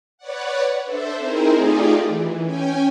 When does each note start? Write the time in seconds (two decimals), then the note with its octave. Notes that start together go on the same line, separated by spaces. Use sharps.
0.18 B4 C#5 D5 F#5
0.85 D4 A4 C5 E5
1.18 C4 D#4 E4 G#4 A#4 C5
1.54 A3 D#4 F4 G4 G#4 D5
2.06 E3
2.43 C#4 G5 G#5